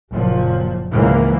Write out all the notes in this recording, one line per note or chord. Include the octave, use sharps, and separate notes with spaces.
F#1 A#2 F3
C#2 G#2 E3 F#3 A#3